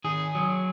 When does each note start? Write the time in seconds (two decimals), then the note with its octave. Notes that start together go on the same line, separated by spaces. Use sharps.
0.04 D#3 G#4
0.35 F#3